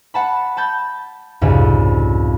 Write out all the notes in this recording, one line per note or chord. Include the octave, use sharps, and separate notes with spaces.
F#5 A5 B5
A5 B5 G6 A6
C2 F2 G#2 C#3